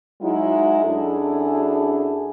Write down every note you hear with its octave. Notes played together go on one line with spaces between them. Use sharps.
F#3 G#3 D#4 E4
F#2 D4 E4 G#4 A4